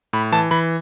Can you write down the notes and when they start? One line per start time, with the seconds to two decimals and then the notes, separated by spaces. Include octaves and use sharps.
0.13 A2 B5
0.32 E3 A5
0.51 E3 B5